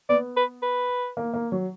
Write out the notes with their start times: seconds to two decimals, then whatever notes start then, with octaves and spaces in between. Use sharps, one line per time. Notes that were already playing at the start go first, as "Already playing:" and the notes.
0.09 B3 D5
0.37 B4
0.62 B4
1.17 A#3
1.33 A#3
1.52 F#3